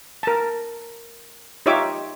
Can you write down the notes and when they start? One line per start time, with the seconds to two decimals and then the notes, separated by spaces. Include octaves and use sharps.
0.23 A#4 A5
1.66 D#4 F4 G4 C#5 E5 D6